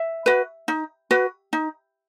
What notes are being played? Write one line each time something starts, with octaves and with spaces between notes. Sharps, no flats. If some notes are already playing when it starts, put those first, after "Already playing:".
Already playing: E5
F#4 B4
D#4
F#4 B4
D#4